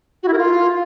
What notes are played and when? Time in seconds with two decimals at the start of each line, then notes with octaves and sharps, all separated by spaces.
0.23 F#4
0.28 E4
0.33 A#4
0.38 F4